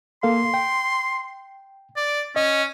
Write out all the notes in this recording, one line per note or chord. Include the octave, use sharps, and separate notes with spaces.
A#3 A4 F5 C6
G5
D5
C#4 D#5